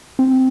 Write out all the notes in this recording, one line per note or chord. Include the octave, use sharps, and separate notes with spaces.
C4